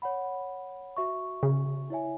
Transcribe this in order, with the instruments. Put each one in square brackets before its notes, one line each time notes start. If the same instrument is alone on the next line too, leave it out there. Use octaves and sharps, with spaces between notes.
[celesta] C#5 F#5 B5
F#4 E5 C#6
[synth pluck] C#3
[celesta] E4 C#5 E5 G#5